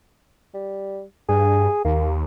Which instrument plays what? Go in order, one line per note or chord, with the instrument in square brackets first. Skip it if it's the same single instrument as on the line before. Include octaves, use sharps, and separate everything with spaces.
[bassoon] G3
[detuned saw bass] G2 [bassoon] G#4
[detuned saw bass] D#2 [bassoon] A#3